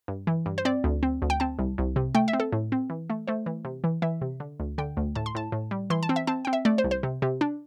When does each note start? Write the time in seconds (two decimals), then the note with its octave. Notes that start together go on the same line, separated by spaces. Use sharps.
0.08 G2
0.27 E3
0.46 G2
0.58 C5
0.65 C4 D5
0.84 D2
1.03 C4
1.22 D2
1.30 G5
1.40 C4 A5
1.59 C2
1.78 C2
1.96 C3
2.15 A3 G5
2.28 E5
2.33 C4
2.40 A4
2.52 A2
2.72 C4
2.90 E3
3.10 A3
3.27 A3 C5
3.46 E3
3.65 C3
3.84 E3
4.02 E3 E5
4.21 C3
4.40 D3
4.60 D2
4.78 D3 G5
4.97 D2
5.15 A2 A5
5.26 C6
5.35 A2 A5
5.52 A2
5.71 G3
5.90 E3 C6
6.03 A5
6.09 C4
6.16 E5
6.27 C4 A5
6.45 C4 G5
6.53 E5
6.65 A3 D5
6.78 C5
6.84 C2
6.91 C5
7.03 C3
7.22 C3
7.41 D4